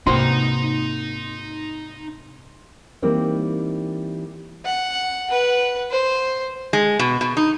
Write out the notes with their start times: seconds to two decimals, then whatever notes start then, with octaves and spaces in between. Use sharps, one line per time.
0.07 G#2 C3 A#3 D#4 F#4 C5 A#5 C6
3.02 E3 G3 A#3 C4 D#4
4.65 F#5
5.30 B4 F#5
5.90 C5
6.73 G#3
6.99 B2
7.21 B2
7.37 D#4